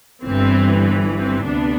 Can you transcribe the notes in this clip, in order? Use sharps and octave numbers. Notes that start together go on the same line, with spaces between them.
G1 G2 E3 C4
C4
D2 C3 B3 D4